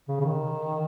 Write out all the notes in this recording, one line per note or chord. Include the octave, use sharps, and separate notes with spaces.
C#3
C#3
D#3